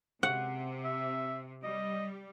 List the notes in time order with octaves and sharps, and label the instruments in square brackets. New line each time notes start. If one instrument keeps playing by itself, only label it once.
[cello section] C3 [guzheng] F#5
[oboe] E5
[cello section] G3 [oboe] D#5